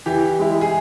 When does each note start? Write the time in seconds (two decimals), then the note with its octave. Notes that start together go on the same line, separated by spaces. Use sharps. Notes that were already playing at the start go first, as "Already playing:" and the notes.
0.06 E3 G4
0.39 G#3 E4
0.61 G#4